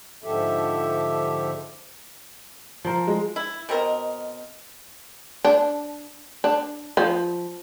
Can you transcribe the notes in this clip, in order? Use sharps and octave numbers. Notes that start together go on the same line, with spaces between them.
G#2 D3 F3 G4 A4 E5
F3 A#4
G#3
E4
B2 C4 A#4 D#5
D4
D4
F3